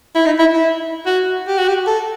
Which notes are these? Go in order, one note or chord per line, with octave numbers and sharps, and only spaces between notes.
E4
D#4
E4
E4
F#4
G4
F#4
G4
A4